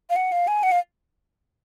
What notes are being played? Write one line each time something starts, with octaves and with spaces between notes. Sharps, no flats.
F5
F#5
F5
G#5
F#5
F5